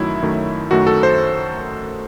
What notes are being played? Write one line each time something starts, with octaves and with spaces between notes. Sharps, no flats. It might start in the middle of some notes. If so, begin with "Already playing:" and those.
Already playing: F#2 D#3 F#3 A3 E4
F#2 D#3 F#3 A3
F#2 D#3 A3 F#4
A4
C5